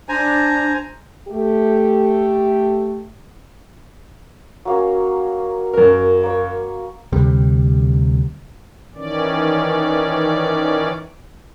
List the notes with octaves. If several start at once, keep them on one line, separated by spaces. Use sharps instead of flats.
D4 C5 G#5 A#5
A3 G4
F#3 A#3 C#4
F#2 A#4
A#3 C#5
D2 C3 G3
D#3 E3 C#4 D5